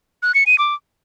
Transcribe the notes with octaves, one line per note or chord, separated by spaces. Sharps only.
F#6
C#7
D#7
D6